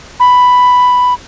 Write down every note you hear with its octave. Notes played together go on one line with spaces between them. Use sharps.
B5